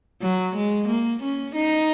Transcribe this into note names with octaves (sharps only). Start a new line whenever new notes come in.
F#3
G#3
A#3
C#4
D#4